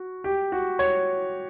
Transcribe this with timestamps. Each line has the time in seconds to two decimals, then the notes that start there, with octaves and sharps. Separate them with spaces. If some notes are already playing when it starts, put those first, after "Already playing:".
Already playing: F#4
0.24 G4
0.52 F#4
0.79 C#5